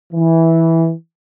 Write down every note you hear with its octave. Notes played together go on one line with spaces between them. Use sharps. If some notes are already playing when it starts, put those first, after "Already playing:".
E3